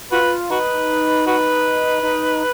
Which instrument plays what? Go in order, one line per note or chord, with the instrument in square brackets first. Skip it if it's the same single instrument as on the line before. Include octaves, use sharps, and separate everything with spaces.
[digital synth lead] F4 [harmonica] F#4 B4
[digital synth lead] D#4 [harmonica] F#4 B4
[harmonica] F#4 B4
[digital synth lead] D#4